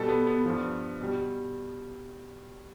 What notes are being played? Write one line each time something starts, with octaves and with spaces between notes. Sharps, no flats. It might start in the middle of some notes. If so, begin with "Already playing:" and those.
Already playing: B2 G3 A4
B3
B3
G2 F3
B2 G3